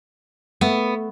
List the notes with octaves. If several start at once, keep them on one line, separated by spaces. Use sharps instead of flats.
A3 B3